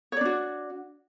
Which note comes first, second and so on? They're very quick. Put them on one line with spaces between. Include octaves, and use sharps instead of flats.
C#5 D5 D4 F#4